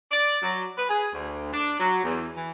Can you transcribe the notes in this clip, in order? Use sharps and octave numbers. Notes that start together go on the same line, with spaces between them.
D5
F#3
B4
G#4
D2
D4
F#3
E2
E3